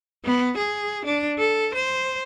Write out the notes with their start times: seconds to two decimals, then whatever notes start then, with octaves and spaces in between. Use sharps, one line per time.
0.25 B3
0.57 G#4
1.05 D4
1.39 A4
1.74 C5